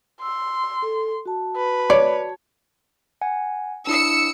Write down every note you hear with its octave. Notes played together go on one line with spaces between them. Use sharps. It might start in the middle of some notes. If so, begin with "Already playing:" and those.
C6 E6
A4
F#4 A5
B4
C#5 D5
F#5 G#5
D4 E4 D#6 E6 C#7